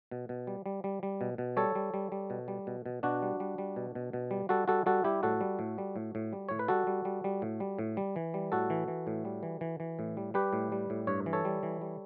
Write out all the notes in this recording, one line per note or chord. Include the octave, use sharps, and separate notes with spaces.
B2
B2
G3
G3
G3
G3
B2
B2
G3 A4 C#5
G3
G3
G3
B2
G3
B2
B2
B2 D4 F#4
G3
G3
G3
B2
B2
B2
G3
G3 F#4 A4
G3 F#4 A4
G3 F#4 A4
G3 E4 G4
A2 F#4 A4
G3
A2
G3
A2
A2
G3
A2 C#5
B4
G3 F#4 A4
G3
G3
G3
A2
G3
A2
G3
E3
G3
A2 F#4 A4
E3
E3
A2
G3
E3
E3
E3
A2
G3
G3 G4 B4
A2
G3
A2
G2 C#5
E3
A4 C#5
G3
E3
G3